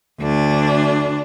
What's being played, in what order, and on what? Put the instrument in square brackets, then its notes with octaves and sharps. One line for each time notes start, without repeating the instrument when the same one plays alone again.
[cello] D2 D4